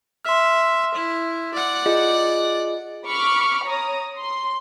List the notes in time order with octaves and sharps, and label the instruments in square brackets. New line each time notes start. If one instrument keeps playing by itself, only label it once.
[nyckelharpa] E5 [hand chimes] C6 F6
[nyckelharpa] E4
D5 F#5
[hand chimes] F4 G#4 D#5
[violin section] B5 C#6 D6 F6
C#5 A#5 D#6
C6